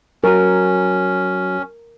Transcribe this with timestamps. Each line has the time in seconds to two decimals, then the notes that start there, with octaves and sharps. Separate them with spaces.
0.24 F#3 C#4 F#4 A#4